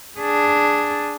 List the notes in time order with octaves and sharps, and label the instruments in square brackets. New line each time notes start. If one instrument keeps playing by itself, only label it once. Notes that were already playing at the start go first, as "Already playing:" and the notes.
[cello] D4 G#4